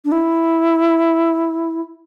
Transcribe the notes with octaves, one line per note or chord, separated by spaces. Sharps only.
D4
E4